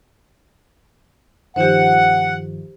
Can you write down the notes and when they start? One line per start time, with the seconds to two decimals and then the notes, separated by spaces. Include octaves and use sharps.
1.56 G2 D#3 F3 G4 C5 F#5